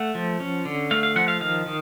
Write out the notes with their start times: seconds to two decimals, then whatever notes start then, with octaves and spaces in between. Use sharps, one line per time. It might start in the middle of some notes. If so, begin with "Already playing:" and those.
Already playing: A3 F#5
0.15 F3
0.40 C#4
0.65 D3
0.91 A3 F5
1.03 F5
1.16 F3 F#5
1.28 F5
1.41 D#3 F5
1.66 D#3